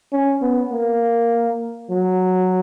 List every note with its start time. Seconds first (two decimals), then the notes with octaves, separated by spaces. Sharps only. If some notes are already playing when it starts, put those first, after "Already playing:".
0.12 C#4
0.41 B3
0.71 A#3
1.89 F#3